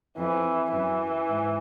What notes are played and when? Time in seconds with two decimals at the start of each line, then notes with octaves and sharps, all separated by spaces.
0.18 F2 E3
0.73 F#2 E3
1.29 G#2